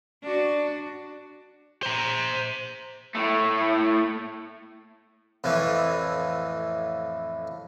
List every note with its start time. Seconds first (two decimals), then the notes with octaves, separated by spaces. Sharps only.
0.22 D4 F#4
1.83 C5 A#5
3.15 A2 A3
5.44 F2 A2 E3